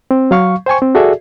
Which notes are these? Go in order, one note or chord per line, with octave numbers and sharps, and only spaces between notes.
C4
F#3 F5 C#6
C5 G5 G#5 C#6
C4
F#4 G#4 A4 D5 E5